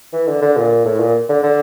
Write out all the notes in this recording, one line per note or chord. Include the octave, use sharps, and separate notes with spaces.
E3
D3
D3
A#2
A2
A#2
D3
D3